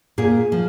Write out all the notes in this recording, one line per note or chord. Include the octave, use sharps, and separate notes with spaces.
A#2 G#4
F3